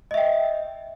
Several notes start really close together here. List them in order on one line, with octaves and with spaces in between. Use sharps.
D#5 E5 G5